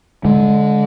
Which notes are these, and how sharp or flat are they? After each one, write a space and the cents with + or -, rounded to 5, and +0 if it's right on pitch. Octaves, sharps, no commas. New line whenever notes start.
D3 -20 G#3 +0